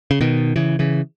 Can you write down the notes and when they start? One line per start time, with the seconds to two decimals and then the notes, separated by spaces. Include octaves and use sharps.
0.11 C#3
0.21 B2 D#3
0.56 C#3 E3
0.79 C#3 E3